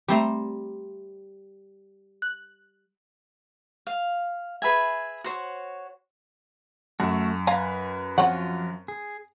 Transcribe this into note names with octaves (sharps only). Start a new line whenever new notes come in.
G3 A3 C4 G4 C5 A#5
F#6
F5
G#4 B4 E5 G#5
F#4 C5 C#5
F#2 A3 F#4
B4 F5 G#5 A#5
F3 C4 F4 F#4 C#5 F#5
G#4